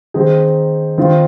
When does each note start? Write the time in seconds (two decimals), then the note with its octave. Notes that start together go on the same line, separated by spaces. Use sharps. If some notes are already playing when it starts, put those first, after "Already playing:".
0.14 D#3 C4 D#4 G#4
0.98 D#3 C4 F4